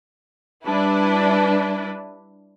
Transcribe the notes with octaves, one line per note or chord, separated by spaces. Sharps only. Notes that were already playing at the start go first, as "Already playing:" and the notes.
G3 D4 E4 B4